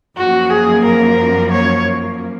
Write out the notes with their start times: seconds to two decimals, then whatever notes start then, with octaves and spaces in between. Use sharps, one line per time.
0.17 F#2 F3 A#3 F#4
0.50 G#4
0.84 A#4
1.51 C#5